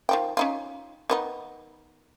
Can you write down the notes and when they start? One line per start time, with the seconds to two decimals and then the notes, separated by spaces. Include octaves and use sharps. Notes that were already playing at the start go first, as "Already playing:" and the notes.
0.09 D#3 F3 G5
0.37 C#4 D#4 F4
1.10 D#3 B3 D#4